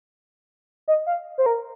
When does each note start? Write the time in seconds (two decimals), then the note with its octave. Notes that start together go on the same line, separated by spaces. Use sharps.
0.88 D#5
1.07 F5
1.38 C5
1.46 A#4